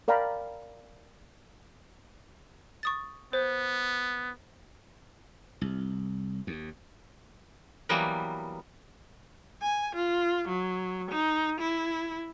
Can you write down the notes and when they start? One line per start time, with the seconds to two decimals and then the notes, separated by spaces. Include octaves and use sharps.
0.08 A#4 D5 F5 G5 A#5 B5
2.83 C#6 D#6 A6
3.33 B3 C5
5.61 C2
6.47 D#2
7.89 E3 F#3 G3 A#3 B3
9.62 G#5
9.95 F4
10.48 F#3
11.11 D#4
11.60 E4